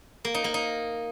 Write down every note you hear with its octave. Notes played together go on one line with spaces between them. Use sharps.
A#3
D#4
A#3
D#4